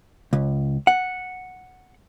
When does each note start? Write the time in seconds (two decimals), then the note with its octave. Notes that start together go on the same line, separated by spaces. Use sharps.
0.33 C#2
0.87 F#5